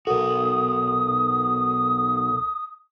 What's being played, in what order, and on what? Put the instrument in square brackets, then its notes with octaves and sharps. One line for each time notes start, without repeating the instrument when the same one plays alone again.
[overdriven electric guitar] B1 F#4 [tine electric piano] A4 A#4 [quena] D#6